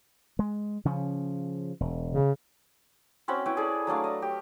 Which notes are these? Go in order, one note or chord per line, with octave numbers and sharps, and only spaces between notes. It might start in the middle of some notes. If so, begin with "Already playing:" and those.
G#3
C#3 F3 C#4
E1
C#3
C4 C#4 F#4 B5
E4 B4 C#5 G5
G#4 A4 D5
F#3 A3 D4 F5
D#5
G4